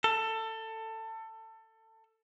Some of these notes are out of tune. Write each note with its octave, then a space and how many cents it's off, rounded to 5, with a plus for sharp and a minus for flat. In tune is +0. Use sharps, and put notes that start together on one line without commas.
A4 +20